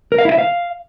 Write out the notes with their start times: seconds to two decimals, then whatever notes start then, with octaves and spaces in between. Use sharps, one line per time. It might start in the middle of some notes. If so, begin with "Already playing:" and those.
0.12 A#4
0.18 F5
0.25 E4
0.32 E5
0.38 F5